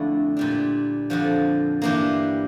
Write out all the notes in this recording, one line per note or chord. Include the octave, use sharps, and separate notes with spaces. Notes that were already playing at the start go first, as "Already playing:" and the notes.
Already playing: F2 D3 A3 E4
A#2 G3 D4
F2 D3 F3
G2 E3 A#3 D4 G4